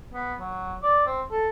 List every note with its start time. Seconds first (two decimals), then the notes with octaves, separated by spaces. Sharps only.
0.14 B3
0.39 F#3
0.83 D5
1.07 C4
1.31 A4